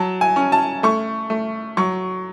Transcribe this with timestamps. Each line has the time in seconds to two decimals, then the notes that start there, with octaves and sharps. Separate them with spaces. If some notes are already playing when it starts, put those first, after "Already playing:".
Already playing: F#3 A5
0.21 G#5
0.36 C#4
0.52 A5
0.83 A3 C#6
1.30 A3
1.77 F#3 C#6